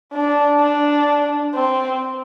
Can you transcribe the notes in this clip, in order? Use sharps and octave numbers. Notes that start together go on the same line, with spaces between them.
D4
D4
C4